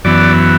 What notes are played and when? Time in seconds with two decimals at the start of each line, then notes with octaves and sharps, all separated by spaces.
0.04 F#2 E3 B3 D5